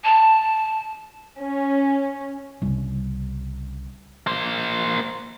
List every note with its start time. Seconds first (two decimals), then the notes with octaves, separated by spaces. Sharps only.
0.04 A5
1.41 C#4
2.62 C2 C#3
4.27 A#3 C5